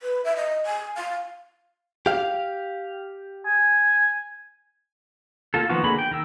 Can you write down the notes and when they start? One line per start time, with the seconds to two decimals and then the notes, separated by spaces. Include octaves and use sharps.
0.02 B4
0.25 E5
0.36 D#5
0.66 G#5
0.96 F5
2.06 G4 F5
3.46 G#5
5.54 A#3 F4 A4
5.69 D#3 F3 A#3 B3 F#4
5.84 D3 A#3 G#4 B5
5.99 G5
6.11 D#3 A#4 E6